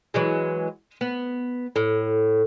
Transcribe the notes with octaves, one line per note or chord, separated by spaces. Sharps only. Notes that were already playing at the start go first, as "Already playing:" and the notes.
E3 F#3 G#3
B3
A2